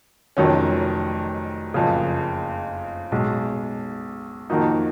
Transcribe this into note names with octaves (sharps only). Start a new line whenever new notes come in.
F1 F2 D#3 F#3 C#4
F#1 F2 C#3
B1 B2 G#3
F2 D#3 A#3 D#4 F#4